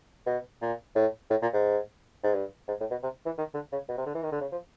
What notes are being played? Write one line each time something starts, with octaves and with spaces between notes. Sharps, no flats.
B2
A#2
A2
A2
A#2
G#2
G#2
G2
G#2
A2
B2
C3
E3
D#3
D3
C#3
B2
C3
D3
E3
D#3
D3
C#3
F3